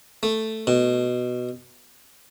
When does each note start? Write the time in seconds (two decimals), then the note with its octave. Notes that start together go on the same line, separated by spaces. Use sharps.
0.23 A3
0.67 B2